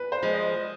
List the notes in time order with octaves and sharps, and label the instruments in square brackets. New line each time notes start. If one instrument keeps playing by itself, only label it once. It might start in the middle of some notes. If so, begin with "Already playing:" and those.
Already playing: [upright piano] B4
C5
[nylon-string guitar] F3 G#3
[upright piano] D#5